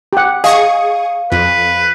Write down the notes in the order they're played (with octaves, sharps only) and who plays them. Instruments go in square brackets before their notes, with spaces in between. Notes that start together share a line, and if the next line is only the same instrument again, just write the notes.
[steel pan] G4 F#5
[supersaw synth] G#4 C#6 D#6 [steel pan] D#5 [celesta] F5
[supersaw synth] F2 [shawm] B4